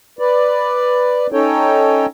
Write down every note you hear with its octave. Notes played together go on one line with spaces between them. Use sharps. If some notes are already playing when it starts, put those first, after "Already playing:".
B4 D5
C#4 D#4 A4 C#5 G5